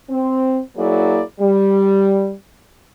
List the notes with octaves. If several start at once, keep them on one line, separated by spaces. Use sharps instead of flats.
C4
F#3 A#3 E4 G#4 D5
G3